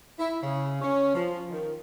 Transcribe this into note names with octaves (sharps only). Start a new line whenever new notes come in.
E4
C#3
C#4
F3
D#3